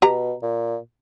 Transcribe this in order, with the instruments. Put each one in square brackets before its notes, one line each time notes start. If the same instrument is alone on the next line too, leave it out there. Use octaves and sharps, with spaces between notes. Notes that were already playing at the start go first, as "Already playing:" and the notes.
[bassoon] B2 [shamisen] G4 A#5
[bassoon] A#2